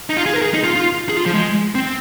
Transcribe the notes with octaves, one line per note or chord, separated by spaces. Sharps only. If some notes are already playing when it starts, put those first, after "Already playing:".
D#4
F4
G#4
A#4
G#4
D#4
F4
F4
G#4
F4
F3
G#3
C4